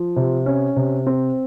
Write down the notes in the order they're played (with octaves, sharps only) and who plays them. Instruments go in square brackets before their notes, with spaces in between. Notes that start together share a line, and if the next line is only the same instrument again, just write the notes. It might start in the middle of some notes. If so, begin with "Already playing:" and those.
Already playing: [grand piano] F3
C3
C#4
C3
C4